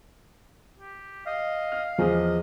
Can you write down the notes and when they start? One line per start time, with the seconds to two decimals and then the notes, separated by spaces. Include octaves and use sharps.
0.78 G4
1.26 D#5 F5
1.72 F6
1.98 E2 F3 G#4 D#5